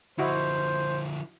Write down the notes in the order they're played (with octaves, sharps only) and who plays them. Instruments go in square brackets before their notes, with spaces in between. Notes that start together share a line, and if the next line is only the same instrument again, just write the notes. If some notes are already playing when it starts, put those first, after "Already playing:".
[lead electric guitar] D3 F3 [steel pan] E4 F#4 D#5 [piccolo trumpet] C5